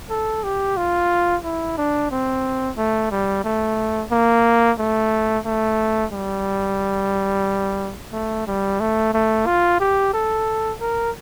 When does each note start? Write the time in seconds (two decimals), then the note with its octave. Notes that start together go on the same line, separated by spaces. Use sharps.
0.10 A4
0.44 G4
0.77 F4
1.44 E4
1.78 D4
2.11 C4
2.78 A3
3.12 G3
3.45 A3
4.12 A#3
4.79 A3
5.45 A3
6.13 G3
8.13 A3
8.47 G3
8.80 A3
9.14 A3
9.47 F4
9.80 G4
10.14 A4
10.81 A#4